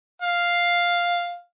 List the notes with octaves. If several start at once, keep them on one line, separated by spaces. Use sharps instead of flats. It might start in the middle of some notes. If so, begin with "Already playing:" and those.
F5